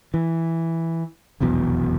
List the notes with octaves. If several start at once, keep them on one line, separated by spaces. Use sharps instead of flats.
E3
F1 B1 E2 B2